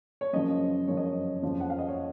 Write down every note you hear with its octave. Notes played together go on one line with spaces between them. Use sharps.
C#5
F#2 C#3 F3 D#5
F#2 C#3 F3 C#5
D#5
C#5
F2 C#3 F3 C4
F#5
F5
D#5
C#5